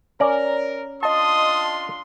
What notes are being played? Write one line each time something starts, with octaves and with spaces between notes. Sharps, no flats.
C#4 A#4 D5 A#5
D4 F4 D#5 A5 C6 D#6